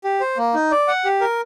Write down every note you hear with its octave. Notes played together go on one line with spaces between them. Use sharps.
G4
C5
A#3
D#4
D5
F#5
G4
A#4